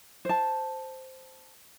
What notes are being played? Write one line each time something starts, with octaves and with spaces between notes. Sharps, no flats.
C5 A5